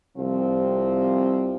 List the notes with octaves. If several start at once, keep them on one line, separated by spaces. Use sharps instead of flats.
C2 C3 F3 C4